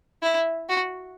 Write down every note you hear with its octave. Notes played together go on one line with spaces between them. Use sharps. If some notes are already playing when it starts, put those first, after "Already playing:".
E4
F#4